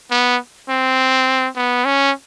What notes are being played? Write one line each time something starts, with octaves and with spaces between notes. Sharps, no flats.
B3
C4
B3
C#4